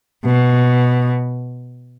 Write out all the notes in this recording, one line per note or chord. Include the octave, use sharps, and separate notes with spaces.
B2